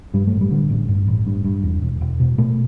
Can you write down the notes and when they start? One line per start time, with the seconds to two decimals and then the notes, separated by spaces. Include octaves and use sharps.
0.14 G2 G3
0.27 A1 A3
0.41 G3
0.51 D3
0.70 A1
0.88 G2
1.07 A1
1.26 G2
1.44 G2
1.64 E2
1.82 E1
2.01 E1
2.20 B2
2.38 B2 A3